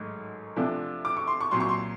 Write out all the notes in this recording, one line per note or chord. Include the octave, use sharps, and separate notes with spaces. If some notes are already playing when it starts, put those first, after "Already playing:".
Already playing: A1 G#2 D#3 F#3 A3
E2 C3 F3 A3 D4
D6
C#6
C6
C#6
C2 A#2 F#3 C6
C#6
C6